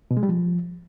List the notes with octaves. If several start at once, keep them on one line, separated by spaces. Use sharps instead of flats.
B2
G#3
G3
F3